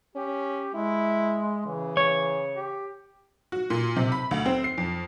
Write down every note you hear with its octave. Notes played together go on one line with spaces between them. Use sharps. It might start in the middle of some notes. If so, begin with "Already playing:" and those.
C#4 G4
G#3 E4
C#3 E3
C#5
G4
F#4
A#2
C3
B5
D2
C4
C7
F2